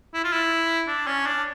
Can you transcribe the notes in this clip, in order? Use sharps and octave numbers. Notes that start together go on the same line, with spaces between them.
E4
F4
E4
D4
C#4
D4